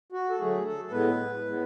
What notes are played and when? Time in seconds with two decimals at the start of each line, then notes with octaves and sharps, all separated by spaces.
0.12 F#4
0.30 A4
0.39 D3 F#3 A3 G#4
0.65 A4
0.85 A4
0.91 A2 G#3 B3 B4
1.45 A2 G#3 B3